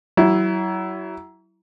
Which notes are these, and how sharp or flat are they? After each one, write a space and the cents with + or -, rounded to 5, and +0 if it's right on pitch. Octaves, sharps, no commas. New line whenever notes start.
F#3 +30 E4 +0